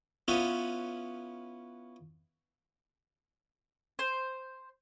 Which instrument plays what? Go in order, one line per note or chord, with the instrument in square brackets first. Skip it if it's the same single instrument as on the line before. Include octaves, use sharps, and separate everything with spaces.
[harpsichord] B3 C#4 E4 F4 B4
[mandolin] C5